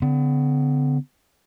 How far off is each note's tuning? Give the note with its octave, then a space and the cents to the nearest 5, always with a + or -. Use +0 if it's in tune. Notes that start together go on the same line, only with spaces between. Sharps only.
D3 -30 B3 +35